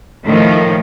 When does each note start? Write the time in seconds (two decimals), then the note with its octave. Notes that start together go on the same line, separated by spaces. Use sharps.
0.24 A2 D#3 F3